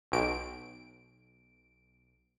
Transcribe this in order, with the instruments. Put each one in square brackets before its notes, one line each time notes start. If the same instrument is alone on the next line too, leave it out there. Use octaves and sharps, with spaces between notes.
[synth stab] B1 D7